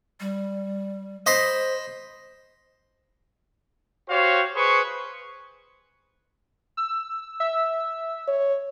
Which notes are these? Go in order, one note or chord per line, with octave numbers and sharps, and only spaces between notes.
G3
C5 D#5 B5 C6
F#4 G4 C5 C#5 F5
G#4 B4 C5 C#6
E6
E5 E6
C#5